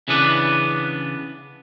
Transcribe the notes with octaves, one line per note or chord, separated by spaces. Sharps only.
C#3 E3 B3 D4 B4